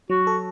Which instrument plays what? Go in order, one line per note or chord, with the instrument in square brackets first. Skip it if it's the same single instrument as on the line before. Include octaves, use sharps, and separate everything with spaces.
[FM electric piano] F#3 [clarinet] F#4
[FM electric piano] A4